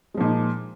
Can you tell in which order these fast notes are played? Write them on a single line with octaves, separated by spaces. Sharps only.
G#3 F3 A#2 D#4